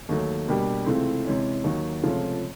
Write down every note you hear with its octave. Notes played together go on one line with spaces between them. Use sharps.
D#2 D#3 F#3 A3
B2 G3 A#3 D4 G4
C#2 C3 E3 A3 C4
C3 E3 G#3 C#4
D#2 D#3 F#3
C#2 C3 F3 A3 C#4